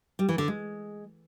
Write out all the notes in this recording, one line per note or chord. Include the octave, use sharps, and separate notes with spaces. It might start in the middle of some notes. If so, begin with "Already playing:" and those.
G3
E3
D3
G#3